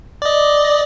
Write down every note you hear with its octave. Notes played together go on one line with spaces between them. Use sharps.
D5 D#5